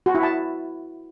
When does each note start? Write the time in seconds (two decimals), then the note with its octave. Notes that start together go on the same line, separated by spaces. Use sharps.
0.06 F#4
0.15 E4
0.23 A5